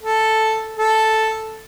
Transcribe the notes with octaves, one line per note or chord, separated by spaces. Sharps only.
A4
A4